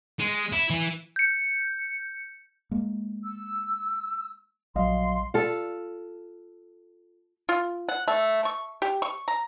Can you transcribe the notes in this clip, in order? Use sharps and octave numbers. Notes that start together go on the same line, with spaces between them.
G#3
E4
E3
G6 C#7
G#3 A#3
E6
A#1 F#3 G3 D#5 F5 C6
F4 A4
F4
F#5
A3
C#6
G4
C#6
A#5